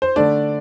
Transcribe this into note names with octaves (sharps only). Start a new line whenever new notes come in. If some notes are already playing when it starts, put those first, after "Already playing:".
C5
D3 A3 D4 D5